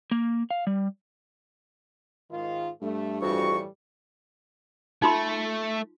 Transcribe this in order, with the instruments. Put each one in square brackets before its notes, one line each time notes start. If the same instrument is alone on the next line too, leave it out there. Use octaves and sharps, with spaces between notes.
[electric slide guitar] A#3
F5
G3
[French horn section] G#2 D#3 F4
[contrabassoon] G2 [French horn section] A3
[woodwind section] F2 F#4 C#6 [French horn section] A2 E3 G3
[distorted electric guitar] A3 [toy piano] D#4 F4 C6